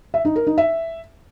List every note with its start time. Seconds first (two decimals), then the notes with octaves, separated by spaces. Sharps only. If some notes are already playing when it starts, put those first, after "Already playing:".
0.14 E5
0.25 D#4
0.36 A#4
0.47 D#4
0.58 E5